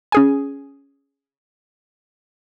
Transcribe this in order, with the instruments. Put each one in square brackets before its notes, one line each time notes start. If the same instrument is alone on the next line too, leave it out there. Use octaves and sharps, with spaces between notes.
[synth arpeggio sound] C#4 G#4 G#5